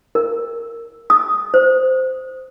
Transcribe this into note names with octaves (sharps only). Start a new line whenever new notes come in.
A#4
D#6
C5